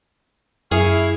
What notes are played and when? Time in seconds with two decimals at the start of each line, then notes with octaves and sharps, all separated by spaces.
0.72 F#2 E4 G#4 F5 C#6 F6